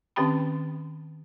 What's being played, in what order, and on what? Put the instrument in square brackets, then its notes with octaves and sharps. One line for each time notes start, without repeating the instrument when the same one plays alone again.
[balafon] D#3 C4 C#4 G4 G5 B5